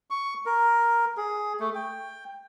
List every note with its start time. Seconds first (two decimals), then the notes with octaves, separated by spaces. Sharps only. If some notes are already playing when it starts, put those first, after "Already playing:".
0.10 C#6
0.46 A#4
1.17 G#4
1.60 A3
1.75 G5